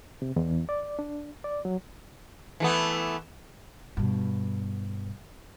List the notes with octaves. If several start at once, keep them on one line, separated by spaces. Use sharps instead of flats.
C3
E2
D5
D4
D5
F#3
E3 A3 B3
G2 B2